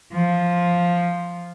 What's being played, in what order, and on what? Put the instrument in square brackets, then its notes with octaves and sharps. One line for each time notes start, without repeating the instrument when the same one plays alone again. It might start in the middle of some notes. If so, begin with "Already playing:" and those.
[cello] F3